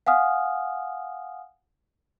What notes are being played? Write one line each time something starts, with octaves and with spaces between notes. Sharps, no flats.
F5 F#5 G#5 D#6 F6